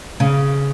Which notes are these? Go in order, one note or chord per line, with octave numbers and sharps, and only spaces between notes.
C#3